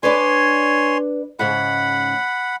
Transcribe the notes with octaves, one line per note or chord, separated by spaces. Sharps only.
D4 B4 C#5 D5 G#5 C6
G#2 C#3 F#5 B5